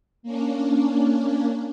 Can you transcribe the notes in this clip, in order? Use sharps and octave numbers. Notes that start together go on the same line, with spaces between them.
A#3 C#4 D4